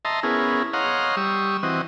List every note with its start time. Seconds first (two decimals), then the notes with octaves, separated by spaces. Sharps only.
0.05 D#5 E5 A5 A#5 C6
0.23 B3 C#4 E4 G#4 A#4
0.73 C#5 D#5 F5 F#5 A#5 C6
1.17 G3 C#6 D#6 E6
1.63 E3 C4 F#4 D#5